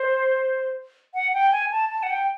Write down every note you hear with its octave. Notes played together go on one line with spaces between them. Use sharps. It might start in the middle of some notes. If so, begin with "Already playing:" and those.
Already playing: C5
F#5
G5
G#5
A5
A5
F#5
G5